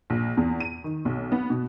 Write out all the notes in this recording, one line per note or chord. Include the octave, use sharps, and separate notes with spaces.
A#1
E2
D#7
D#3
B1
B3
B2